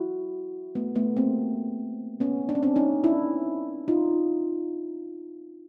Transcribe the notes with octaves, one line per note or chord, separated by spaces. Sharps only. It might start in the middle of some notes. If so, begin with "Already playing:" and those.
Already playing: E4 F#4
A3 B3
A3 B3
A#3 C4
B3 C#4
D4
C#4
C4 D4
C#4 D#4
D4 E4
D#4 F4